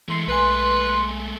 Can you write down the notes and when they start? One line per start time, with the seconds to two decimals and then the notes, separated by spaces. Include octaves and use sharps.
0.08 E3 G#3 A3 C6 C7
0.28 B1 B4 G#5 C6